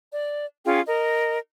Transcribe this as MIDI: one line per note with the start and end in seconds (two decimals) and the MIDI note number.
0.13 0.45 74
0.65 0.80 61
0.65 0.80 65
0.65 0.80 68
0.65 0.80 79
0.86 1.38 70
0.86 1.38 75